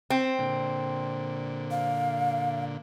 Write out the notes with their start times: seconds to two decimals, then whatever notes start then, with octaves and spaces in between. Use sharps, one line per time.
0.10 C4
0.39 A#2 D3
1.71 F5